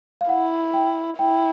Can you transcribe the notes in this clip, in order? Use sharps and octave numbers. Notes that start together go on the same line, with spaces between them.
F5
E4 F#5
G5
E4 G5